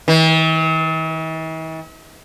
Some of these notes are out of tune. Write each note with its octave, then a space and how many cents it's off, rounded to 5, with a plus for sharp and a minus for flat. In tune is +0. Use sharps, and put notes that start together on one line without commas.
E3 -45